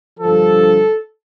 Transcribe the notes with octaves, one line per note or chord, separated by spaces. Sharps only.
G2 D3 F3 A4